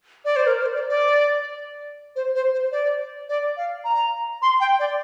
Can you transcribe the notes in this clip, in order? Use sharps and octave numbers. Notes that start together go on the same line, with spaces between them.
D5
C5
A#4
C5
D5
D5
C5
C5
C5
D5
D5
F5
A#5
C6
G5
D5